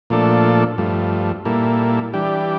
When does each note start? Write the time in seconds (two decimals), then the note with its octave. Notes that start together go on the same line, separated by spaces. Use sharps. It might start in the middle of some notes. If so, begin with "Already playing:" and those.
0.10 A#2 F3 A3 D4 A4
0.78 G2 F3 A3
1.45 A#2 G3 A#3 E4 A4
2.13 E3 G3 D4 G4